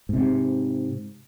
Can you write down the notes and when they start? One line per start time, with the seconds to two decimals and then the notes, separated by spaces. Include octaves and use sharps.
0.09 G#2 C3